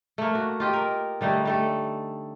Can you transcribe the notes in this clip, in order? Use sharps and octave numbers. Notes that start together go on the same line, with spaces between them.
A3 A#3
F#4
F4 G4 D#5
A#4
D3 G3 A3 D#4
G3 A3 A4